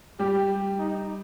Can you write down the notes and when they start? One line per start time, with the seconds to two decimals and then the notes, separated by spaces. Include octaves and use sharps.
0.19 G3 G4
0.78 D#4